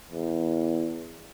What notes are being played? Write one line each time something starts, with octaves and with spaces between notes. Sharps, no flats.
E2